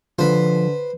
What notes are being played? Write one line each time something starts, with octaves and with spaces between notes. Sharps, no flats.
D3 F3 B4 C5